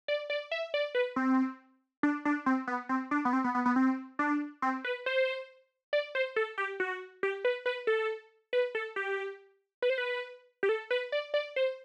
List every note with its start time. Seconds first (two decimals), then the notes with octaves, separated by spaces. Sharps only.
0.08 D5
0.30 D5
0.51 E5
0.74 D5
0.95 B4
1.16 C4
2.03 D4
2.25 D4
2.46 C4
2.67 B3
2.89 C4
3.11 D4
3.25 B3
3.33 C4
3.44 B3
3.55 B3
3.66 B3
3.76 C4
4.19 D4
4.62 C4
4.85 B4
5.06 C5
5.93 D5
6.15 C5
6.36 A4
6.58 G4
6.80 F#4
7.23 G4
7.45 B4
7.66 B4
7.87 A4
8.53 B4
8.75 A4
8.96 G4
9.82 B4
9.90 C5
9.98 B4
10.63 G4
10.69 A4
10.91 B4
11.12 D5
11.34 D5
11.56 C5